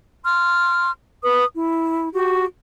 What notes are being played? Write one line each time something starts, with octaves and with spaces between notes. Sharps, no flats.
C6 F6
B4 D#6
E4
F#4 G4